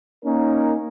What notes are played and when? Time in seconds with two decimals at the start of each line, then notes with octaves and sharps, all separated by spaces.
0.25 A#3 C#4 D#4 A#4